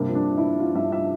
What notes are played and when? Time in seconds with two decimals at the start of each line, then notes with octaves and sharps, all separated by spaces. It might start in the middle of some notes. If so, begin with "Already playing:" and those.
Already playing: G2 C3 A#3
0.09 F3
0.15 D4
0.26 F3
0.38 E4
0.43 F3
0.59 F3 F4
0.75 G2 E5
0.92 E5